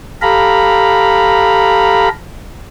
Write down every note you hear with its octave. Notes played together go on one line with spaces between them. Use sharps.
G4 A4 F5 A#5 B5